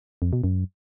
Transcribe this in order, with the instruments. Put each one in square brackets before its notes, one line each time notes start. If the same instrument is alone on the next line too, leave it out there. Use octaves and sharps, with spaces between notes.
[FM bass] F2
B2
F#2